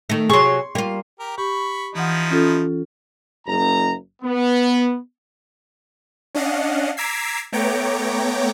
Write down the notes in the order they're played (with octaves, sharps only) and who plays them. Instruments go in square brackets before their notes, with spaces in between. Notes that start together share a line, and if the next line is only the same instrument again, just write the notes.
[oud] D#3 A3
[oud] C3 F#3 [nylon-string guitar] G#4 [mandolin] C6 C#6
[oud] G3 F4 [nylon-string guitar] A#3
[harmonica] G4 A#4
[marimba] G4 [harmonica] B5 C#6
[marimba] E3 F#5 [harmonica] F3 D#4 E4
[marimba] C#4 F4 A4
[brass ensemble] F#1 A#5
B3
[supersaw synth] C#4 D4 D#5 F5 F#5
A#5 D6 E6 G#6 B6 C7
A3 B3 C#5 G5 A#5 D6